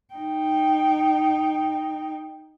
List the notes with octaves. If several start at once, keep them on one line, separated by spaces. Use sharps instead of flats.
D#4 G5